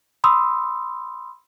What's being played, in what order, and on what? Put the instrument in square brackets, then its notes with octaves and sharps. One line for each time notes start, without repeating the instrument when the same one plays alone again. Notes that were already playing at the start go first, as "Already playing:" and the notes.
[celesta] B5 C6 D#6 E6